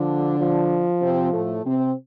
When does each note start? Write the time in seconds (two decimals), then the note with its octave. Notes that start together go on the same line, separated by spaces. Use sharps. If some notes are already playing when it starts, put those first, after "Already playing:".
Already playing: D3 F3 D4
0.40 F3
1.02 C3 C4
1.33 A2 A3
1.65 C3 C4